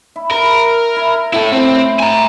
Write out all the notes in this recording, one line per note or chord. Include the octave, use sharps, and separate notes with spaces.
E4
A#4 B4
E4
A2 E4 A4
C4
G#5 A#5